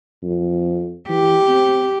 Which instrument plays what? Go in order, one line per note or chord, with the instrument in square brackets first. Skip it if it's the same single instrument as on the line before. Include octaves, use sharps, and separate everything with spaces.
[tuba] F2
[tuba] E3 [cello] G4
[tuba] C4